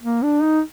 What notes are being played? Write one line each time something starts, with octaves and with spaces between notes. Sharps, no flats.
A#3
D4
D#4